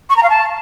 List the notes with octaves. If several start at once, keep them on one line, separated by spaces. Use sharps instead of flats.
C#6
A#5
F5
A5